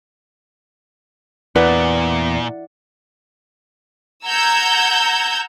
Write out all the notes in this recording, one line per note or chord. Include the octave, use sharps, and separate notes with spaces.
E2 A#2 E4 B4 D5 F#5
F#5 A#5 E6 G6 G#6